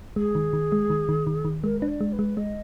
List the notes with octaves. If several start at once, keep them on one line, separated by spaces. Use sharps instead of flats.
G#3 G#4
D#3
D#3
G#3
D#3
D#3
D#3
D#3
G#3 A#4
D4 B4
D5
G#3
B4
G#3
G#3 D#5